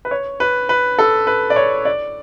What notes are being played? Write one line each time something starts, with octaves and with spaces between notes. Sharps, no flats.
B4
C#5
B4
B4
A4
B4
D5
C#5
D5